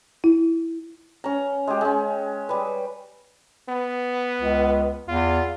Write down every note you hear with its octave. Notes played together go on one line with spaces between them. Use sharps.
E4
C#4 A#5
G#3 G4
G#3 C#4
G3 B4
B3
C#2
E2 F4